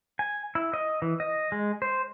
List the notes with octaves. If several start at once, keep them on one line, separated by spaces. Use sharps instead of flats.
G#5
E4
D#5
E3
D#5
G#3
C5